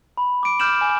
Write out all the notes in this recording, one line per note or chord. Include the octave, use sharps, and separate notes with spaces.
B5
D6 D7
D6 F6 G6 D7 E7 F#7
G#5